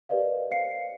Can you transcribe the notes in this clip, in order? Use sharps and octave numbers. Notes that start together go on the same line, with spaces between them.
G4 A#4 B4 D5 D#5 F5
C5 F5 C7 C#7